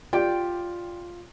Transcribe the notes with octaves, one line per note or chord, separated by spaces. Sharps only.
F4 G4 D5 G5